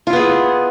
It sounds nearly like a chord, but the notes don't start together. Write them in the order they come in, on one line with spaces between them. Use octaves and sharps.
F4 E4 B3 G#4